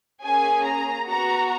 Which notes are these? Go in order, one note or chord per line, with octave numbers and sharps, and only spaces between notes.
A#3 C#4 G#4 G#5
A#5
B3 F#4 A#5